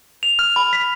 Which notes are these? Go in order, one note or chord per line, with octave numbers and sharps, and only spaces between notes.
F7
F6
B5
B6